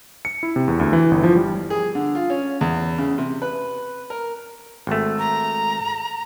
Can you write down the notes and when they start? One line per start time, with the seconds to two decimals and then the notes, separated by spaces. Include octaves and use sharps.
0.25 C#7
0.43 E4
0.56 C3
0.68 E2
0.80 D2
0.93 E3
1.11 G1
1.23 F3
1.36 G3
1.70 G#4
1.95 D3
2.15 F4
2.30 C#4
2.61 E2
2.98 C#3
3.18 C3
3.42 B4
4.10 A#4
4.87 G#1 A3
5.19 A#5